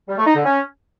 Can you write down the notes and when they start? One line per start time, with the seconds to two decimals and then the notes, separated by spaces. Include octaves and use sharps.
0.08 G3
0.17 A3
0.27 D#4
0.36 D3
0.45 C#4